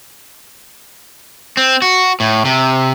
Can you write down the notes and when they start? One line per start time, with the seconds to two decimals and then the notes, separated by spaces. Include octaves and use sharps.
1.57 C4
1.82 F#4
2.20 A2
2.45 C3